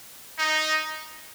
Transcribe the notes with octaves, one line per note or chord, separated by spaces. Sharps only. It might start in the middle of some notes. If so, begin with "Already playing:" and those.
D#4